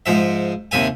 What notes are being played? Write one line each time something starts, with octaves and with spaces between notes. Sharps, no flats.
G#2 F3 E5
D#2 C3 E5 G#5